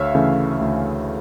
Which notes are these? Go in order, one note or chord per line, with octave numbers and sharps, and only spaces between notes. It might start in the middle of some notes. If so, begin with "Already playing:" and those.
Already playing: D2 C#5 E5 F5
C#3 E3 A3
D2